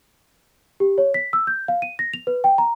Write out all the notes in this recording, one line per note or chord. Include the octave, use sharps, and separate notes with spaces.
G4
C#5
B6
E6
G6
F5
D#7
A#6
F7
B4
G5
A#5